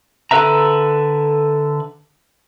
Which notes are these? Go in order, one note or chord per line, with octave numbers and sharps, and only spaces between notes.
D3 A4 B4 E5 A#5